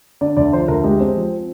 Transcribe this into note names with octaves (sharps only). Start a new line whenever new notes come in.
D3 D5
D2 D5
F3 C5
D2 A#4
G#3 G4
C4
F3